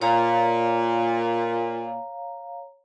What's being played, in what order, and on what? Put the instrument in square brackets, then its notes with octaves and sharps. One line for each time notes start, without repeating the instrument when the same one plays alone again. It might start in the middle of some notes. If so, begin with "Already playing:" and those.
[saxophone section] A#2 [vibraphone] C#5 F5 A#5